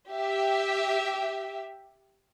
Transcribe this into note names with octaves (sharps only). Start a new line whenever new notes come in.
G4 E5